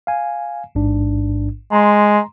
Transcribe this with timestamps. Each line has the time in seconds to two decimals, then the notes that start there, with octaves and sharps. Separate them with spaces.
0.07 F5 G#5
0.75 A1 G#2 D4
1.72 G#3 A#5 C6